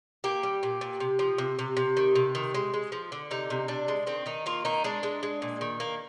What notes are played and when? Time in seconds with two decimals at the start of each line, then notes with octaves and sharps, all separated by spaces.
0.24 A#3 G4
0.43 G3
0.63 A#2
0.81 A#2
1.00 C3
1.19 F3
1.38 C3
1.59 C3
1.77 C3
1.97 D#3
2.15 C3
2.35 D#3
2.54 G#3
2.74 G#3
2.92 F3
3.12 D3
3.31 C3 D#4
3.50 C3
3.68 C3 D4
3.88 G#3
4.07 D#3 C4
4.26 D#3 D#4
4.46 A#3 F4
4.65 D#3 D#4
4.84 G#3 D4
5.03 G#3
5.23 G#3
5.42 A#2
5.61 D#3
5.80 A#3